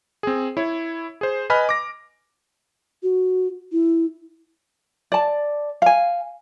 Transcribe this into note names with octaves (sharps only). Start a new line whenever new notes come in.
C4 G#4
E4 C#5
G#4 C5
B4 D#5 G#5 B5 F6
D6 A#6
F#4
E4
D5 A5
F5 G#5